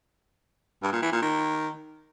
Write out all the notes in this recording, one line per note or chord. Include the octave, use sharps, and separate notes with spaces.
G2
A#2
E3
A#2
D#3